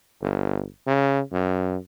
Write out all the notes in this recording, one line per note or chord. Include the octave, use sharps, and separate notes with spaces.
G1
C#3
F#2